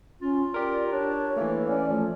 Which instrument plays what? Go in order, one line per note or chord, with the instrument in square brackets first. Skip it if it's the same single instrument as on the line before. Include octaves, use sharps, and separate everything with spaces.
[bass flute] C#4 [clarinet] F4
[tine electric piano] G4 A#4 [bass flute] D5
[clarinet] D4 [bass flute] C#5
[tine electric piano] E3 A3 [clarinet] A#3
[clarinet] C#4 [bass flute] D5
[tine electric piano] F3 [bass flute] A3